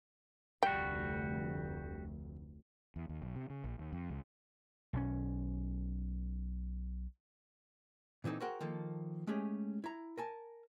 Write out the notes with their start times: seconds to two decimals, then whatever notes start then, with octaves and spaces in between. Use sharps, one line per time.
0.63 F1 D2 G3 F#4 G5
2.96 E2
3.09 D#2
3.22 B1
3.36 C3
3.50 C#3
3.64 A#1
3.79 D#2
3.92 F2
4.10 C#2
4.93 B1 D#3 C#4
8.24 A#2 E3 C4 D#4 A4
8.40 F#4 G#4 A#4 C5 F#5 G5
8.61 D#3 F3 A#3 A4
9.27 G#3 A3 C#4 G4 G#4
9.84 E4 A#5
10.18 A#4 G#5 A5